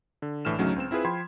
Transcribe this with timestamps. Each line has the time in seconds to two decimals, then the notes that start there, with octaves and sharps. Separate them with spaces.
0.22 D3
0.45 A#1 A2 E3 D4 F6 E7
0.58 D2 C#3 F#3 A3 C#4 D#4
0.76 C#2 C4 E7
0.91 C4 E4 F4 G#4 B4
1.05 F3 G5 B5 C6 G#6